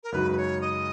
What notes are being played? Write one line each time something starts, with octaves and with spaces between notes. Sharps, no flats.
A#4
F#2 C#3 G#3 D#4 F#4 B4
B4
C#5
D#5